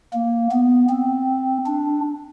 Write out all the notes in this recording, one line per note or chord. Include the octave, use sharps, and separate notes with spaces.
A#3
B3
C4
D4